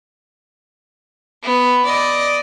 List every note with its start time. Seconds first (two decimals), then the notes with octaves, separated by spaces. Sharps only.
1.43 B3
1.85 D5 D#5